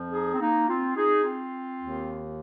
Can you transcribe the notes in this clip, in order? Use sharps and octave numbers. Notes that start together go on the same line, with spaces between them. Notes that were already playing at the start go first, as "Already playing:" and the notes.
Already playing: F2 F3
D#4 G#4
C4
A#3 D#4
C4 F4
D#4 G#4
C4 F4
D#2 D#3